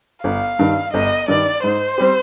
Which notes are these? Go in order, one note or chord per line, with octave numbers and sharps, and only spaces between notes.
G1 F5
G2 D#3
G1 D#5
G2 D#3 D5
G#2 C5
G3 C4 G4